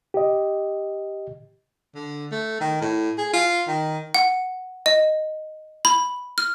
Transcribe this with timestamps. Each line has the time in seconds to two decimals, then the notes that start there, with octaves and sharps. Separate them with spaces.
0.14 G4 D#5
1.95 D3
2.32 A3
2.61 D#3
2.82 A2
3.18 G#4
3.33 F4
3.67 D#3
4.14 F#5
4.86 D#5
5.85 B5
6.38 F6